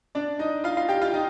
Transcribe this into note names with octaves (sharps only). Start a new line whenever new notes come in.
D4 D5
D#4 D#5
F4 F5
F4 F5
G4 G5
F4 F5
D#4 D#5